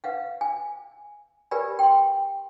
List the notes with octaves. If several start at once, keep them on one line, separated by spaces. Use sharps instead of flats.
B4 F5 F#5
G#5
G4 A#4 B4 D5 G#5 B5
G5 C6